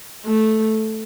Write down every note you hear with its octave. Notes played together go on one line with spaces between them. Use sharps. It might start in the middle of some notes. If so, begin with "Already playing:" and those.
A3